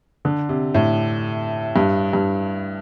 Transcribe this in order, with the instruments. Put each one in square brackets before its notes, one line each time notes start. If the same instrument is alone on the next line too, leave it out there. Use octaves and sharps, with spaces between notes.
[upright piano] D3
C3
A2
G2
G2